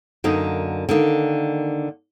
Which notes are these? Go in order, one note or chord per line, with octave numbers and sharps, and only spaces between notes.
F#2 D3 A#3 D#4
D3 D#3 A#3